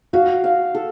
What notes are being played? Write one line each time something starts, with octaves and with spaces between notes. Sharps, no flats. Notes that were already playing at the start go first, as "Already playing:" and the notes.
F#4 F5
F5
A4